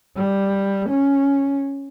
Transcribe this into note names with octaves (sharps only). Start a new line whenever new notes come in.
G3
C#4